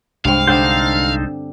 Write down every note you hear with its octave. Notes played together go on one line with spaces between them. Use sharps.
C2 G2 G#3 C4 F5
D3 C4 D#4 A4 C5 D5